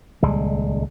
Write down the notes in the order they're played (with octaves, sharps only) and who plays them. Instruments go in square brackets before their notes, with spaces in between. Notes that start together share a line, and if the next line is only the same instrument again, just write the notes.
[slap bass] D#1 C#2 G3 G#3